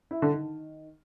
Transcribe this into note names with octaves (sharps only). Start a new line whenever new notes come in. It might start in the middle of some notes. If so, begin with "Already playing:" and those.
E4
D3
D#3